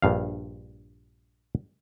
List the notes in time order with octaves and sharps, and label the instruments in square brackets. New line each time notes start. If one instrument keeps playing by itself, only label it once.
[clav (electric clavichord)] A#1 G2 F5